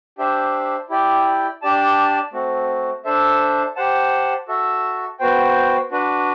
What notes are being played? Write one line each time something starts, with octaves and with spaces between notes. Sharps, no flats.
D4 G4 C5 E5
E4 G4 D5 G5
D4 G4 D5 A5
A3 C4 F#4
D4 A4 C5 E5
G4 C5 F#5 A5
F#4 A4 E5
B3 F#4 C5 G5
D4 F#4 B4